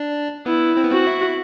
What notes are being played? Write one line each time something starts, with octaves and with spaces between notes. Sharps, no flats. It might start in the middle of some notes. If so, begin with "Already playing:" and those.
Already playing: D4
B3 E4
C4
B3
C4 F#4
E4